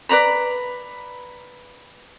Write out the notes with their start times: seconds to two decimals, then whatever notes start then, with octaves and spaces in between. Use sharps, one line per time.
0.09 B4 D5 A#5 B5